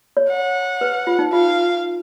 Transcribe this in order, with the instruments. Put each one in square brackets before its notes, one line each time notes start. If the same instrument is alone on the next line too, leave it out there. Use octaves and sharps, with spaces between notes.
[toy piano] C#5
[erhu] F#5
[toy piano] B4
F4
D#4
[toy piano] F4 [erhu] F5